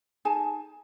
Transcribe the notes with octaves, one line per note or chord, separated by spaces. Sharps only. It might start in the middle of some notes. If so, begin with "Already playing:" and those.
D#4 G#4 G#5 A5